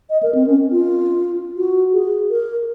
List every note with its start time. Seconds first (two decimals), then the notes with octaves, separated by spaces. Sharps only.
0.10 D#5
0.23 A#4
0.35 C4
0.47 C#4
0.71 F4
1.57 F#4
1.93 G#4
2.30 A#4